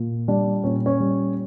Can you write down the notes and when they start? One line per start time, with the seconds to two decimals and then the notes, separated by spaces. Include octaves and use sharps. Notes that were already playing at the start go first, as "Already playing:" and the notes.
Already playing: A#2
0.28 G3 D4
0.64 A#2 C#4
0.86 C#4
1.00 G3